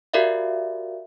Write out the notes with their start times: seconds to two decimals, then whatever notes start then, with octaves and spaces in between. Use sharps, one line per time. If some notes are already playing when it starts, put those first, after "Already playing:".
0.14 F#4 G4 A#4 D5 E5 F5